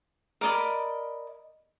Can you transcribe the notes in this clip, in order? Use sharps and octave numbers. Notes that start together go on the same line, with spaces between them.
A#4 D5 D#5 B5